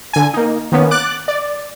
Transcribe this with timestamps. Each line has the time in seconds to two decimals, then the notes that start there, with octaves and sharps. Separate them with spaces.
0.13 D3 G#5
0.34 A#3 D#4
0.72 D#3 A#3 B3 C#4
0.91 D6 F#6 A6
1.28 D5